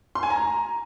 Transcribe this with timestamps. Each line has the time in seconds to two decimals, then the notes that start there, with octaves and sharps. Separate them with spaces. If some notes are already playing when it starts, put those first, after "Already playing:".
0.15 C6
0.23 G#5
0.30 A#5